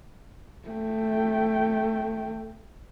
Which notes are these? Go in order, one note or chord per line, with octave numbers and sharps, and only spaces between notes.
A3 G5